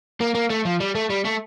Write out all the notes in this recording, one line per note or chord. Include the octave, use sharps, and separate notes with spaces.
A#3
A#3
A3
F3
G3
A3
G3
A3